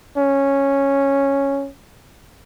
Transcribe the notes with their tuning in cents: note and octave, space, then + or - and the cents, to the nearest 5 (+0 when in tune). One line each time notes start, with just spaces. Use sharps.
C#4 -5